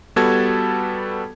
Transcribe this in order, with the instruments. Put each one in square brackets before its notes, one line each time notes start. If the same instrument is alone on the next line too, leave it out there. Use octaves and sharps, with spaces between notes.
[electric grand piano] G3 B3 F#4 A4 A5 G#6